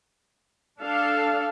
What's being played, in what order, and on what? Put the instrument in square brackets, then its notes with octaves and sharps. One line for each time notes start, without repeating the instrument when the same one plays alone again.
[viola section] D4 A4 F5